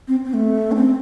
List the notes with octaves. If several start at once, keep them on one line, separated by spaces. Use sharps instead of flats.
C4
C4
A3
D4
C4